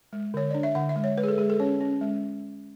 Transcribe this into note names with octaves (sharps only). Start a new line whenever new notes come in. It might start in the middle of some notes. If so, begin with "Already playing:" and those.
G#3
D3 C#5
D4 D5
E5
D3 F#5
E5
G#3
C#5
G#3 B4
G#4
A4
G#3 G#4
A4
C#4 C#5
C#4
G#3